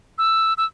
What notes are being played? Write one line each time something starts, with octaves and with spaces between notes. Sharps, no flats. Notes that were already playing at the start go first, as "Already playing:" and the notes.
E6
E6